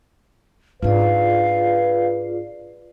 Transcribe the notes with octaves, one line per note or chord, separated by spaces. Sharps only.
G#2 D4 F4 G#4 B4 D5 F5